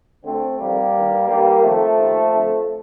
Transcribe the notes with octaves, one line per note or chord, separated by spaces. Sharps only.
D2 D3 A3 C4
F2 C3 D#3 G3 A#3
G2 D#3
G2 D#3 G3 A#3
F2 D#3 F3 A3
D#2 D#3
F2 D3